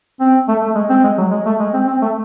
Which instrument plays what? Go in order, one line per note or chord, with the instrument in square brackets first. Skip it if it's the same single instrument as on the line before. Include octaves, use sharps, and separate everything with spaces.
[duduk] C4
A3
A3
G#3
C4
G#3
F#3
G#3
A3
G#3
C4
C4
A3